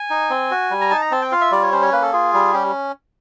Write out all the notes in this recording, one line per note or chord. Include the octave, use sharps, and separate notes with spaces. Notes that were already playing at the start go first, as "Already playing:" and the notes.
Already playing: G#5
D#4
C4
F#4
G3
A#5
D#4 A5
A#5
C4 A5
G5
F4 F5
E5
G3 D5
C#5
C#4 C5
C#5
A#3 B4
A4
F4 G#4
G3
C#4 G4